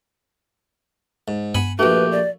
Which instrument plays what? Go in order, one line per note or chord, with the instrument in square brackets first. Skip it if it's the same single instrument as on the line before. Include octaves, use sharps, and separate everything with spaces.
[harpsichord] G#2
[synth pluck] G2 B3 [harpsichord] F#5 G#5 B5
[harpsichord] A#1 A3 [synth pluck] D4 F#4 [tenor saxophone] G4 [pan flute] B4
[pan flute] D5